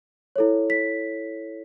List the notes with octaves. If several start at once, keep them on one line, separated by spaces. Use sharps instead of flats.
E4 A4 C#5
B6